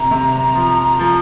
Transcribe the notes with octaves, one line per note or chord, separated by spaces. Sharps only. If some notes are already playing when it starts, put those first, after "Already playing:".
Already playing: C3 A#5
C3
F3
F3